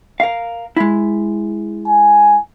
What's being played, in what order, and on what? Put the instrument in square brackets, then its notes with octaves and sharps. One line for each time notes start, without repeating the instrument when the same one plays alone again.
[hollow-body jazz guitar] A#4 F5
G#3 E4
[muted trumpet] G#5